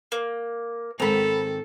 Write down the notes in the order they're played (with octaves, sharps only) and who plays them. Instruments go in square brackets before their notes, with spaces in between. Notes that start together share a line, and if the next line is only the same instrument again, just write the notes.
[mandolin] A#3
[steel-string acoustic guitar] G#2 D#3 C4 [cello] A4 [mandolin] A#5 B5